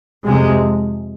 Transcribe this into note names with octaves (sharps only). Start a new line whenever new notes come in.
F2 C3 G#3